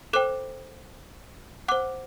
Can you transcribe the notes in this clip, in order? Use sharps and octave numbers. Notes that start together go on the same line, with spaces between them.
A4 C5 G5 D6 F#6
C5 F#5 D6 F#6